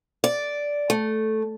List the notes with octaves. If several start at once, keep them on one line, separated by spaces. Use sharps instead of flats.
D5
A3